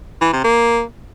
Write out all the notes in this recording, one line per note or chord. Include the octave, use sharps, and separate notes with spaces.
E3
C3
A#3